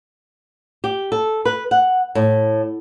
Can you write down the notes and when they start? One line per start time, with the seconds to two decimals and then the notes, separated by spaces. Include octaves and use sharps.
0.84 G4
1.12 A4
1.45 B4
1.71 F#5
2.15 A2